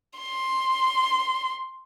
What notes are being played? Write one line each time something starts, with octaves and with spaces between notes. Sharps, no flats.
C6